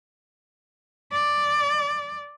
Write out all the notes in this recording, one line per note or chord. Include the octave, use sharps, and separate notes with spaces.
D5